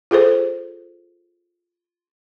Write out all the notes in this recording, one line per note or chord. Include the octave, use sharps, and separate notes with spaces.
F4 G#4 A4 C5